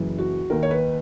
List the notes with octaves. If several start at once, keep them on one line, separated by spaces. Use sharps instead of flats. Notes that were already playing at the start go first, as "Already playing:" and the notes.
Already playing: F#1 F#2 E3
F#4
D#2 D#3 A#4
C#5
B4